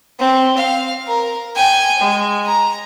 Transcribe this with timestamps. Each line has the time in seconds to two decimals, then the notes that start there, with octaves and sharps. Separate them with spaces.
0.19 C4
0.57 F5
1.07 A#4
1.56 G5 G#5
2.00 G#3
2.46 A#5